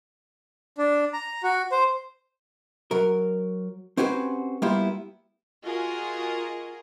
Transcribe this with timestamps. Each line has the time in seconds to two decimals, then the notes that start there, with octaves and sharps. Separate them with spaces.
0.78 D4
1.13 A#5
1.43 F#4
1.72 C5
2.91 F#3 A#4
3.97 C4 C#4 F#4 G4 B4 C5
4.62 G3 A#3 B3 E4 F4 G4
5.64 F4 F#4 G#4 A#4 D#5